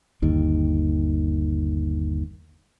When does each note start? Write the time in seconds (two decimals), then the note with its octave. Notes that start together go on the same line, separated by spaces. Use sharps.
0.22 G1 D#2 D#3